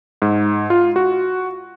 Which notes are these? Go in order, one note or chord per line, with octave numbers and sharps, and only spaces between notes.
G#2
F4
F#4